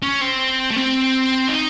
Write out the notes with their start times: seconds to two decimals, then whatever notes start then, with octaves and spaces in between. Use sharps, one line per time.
0.02 C#4
0.21 C4
0.71 A3
0.76 C4
1.48 D#4